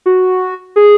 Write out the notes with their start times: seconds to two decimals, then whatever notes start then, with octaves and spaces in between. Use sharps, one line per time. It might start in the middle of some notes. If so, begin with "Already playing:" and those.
0.06 F#4
0.76 G#4